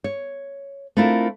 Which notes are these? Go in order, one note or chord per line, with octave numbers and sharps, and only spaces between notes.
C#5
A3 C4 D4 E4 F4 A#4